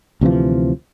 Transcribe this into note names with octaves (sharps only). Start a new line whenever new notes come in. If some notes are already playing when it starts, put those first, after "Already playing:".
D2 C3 E3 F3